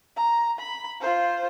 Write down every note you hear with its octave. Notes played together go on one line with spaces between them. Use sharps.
A#5
B5
F4 C5